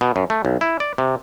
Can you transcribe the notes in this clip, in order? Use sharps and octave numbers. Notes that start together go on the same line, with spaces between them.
B2
F#2
A3
B1
E4
D5
C3